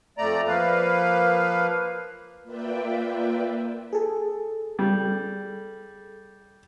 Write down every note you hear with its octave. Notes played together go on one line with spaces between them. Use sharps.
F2 A3 D5 A#5
F3 A#3 B4 F5
A#3 F4 B4 D5 E5 G5
G#4 A4
G3